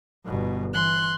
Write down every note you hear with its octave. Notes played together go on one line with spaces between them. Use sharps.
G1 B2
E3 C6 F#6